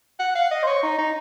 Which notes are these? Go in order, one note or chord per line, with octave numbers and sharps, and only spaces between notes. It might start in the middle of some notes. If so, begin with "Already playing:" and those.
F#5
F5
D#5
C5
C#5
D#4
D#4